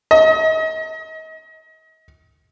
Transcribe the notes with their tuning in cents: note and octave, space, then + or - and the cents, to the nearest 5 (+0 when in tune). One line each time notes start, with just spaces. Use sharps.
D#5 +35